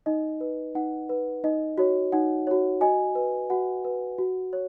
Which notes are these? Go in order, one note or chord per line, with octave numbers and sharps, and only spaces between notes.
D#4 D#5
B4
D#4 F#5
B4
D#4 D#5
F#4 C#5
D#4 F#5
F#4 C#5
F#4 D#5 G#5
B4
F#4 F#5
B4
F#4
C#5